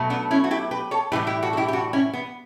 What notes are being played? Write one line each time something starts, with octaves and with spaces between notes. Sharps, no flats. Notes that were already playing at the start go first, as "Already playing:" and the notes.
Already playing: B2 F#3 A3
B3 D4
C#4 E4
F#4
E4 G4
G4 B4
A4 C#5
A2 E3 G3 G4 B4
E4 G4
F#4 A4
A4
E4 G4
G4
D4 F#4
C#4 E4
B3